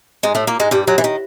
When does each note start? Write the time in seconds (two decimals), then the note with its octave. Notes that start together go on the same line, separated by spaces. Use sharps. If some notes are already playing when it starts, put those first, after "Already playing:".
0.23 G#2 G#3
0.35 A2 A3
0.47 A#2 A#3
0.60 G#2 G#3
0.71 G2 G3
0.87 F#2 F#3
0.98 E3
1.04 D#3